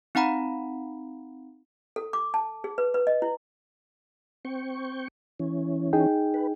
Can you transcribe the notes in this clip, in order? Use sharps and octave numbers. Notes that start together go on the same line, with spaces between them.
C4 D#4 F5 F#5 A#5 B5
A4
D6
A5
G#4
B4
B4
D#5
E4
C4 G5 C#6
E3 C#4
D#4 G#4 G5
B4